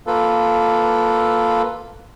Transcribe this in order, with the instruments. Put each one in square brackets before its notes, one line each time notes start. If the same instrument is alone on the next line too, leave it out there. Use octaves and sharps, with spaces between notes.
[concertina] A#3 F4 A4 B4